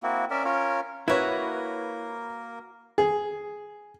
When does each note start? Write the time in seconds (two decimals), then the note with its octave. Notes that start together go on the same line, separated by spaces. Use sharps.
0.03 A#3 C4 E4 F#4
0.30 C#4 A#4 D5 E5
0.45 C#4 F4 A#4 C#5
1.08 A#3 E4 F#4 A#4 B4 C#5 E5
2.98 G#4